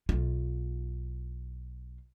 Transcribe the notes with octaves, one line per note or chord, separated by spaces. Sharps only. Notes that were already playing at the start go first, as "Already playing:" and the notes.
B1 F4